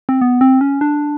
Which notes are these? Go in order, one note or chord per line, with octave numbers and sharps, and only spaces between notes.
C4
B3
C4
C#4
D4